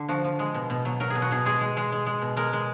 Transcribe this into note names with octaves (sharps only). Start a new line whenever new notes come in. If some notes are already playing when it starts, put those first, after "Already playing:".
Already playing: D3
F3 F#4
F3
G#3
B2
B2
F#3
F#3 A#4
G#4
B2
F#4
B2 G#4
G#3 G#4
G#3
G#3
G#3
G#3
B2
G#3 A#4
G#3